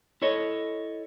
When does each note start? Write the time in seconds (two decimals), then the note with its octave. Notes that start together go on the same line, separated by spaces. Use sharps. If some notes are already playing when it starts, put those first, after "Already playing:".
0.22 E4 A4 C#5 D#5